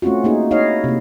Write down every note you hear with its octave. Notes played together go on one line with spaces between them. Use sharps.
A3 C4 C#4 F4 F#4
A#3 D#4 G#4
D#4 E4 C#5 D#5 F5
C3 A#3